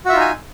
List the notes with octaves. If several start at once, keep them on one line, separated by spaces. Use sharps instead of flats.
D#4 F4 F#4 E5 G#5